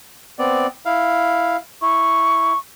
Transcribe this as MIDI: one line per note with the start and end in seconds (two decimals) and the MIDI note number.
0.39 0.67 59
0.39 0.67 60
0.39 0.67 74
0.86 1.57 64
0.86 1.57 77
1.82 2.53 64
1.82 2.58 85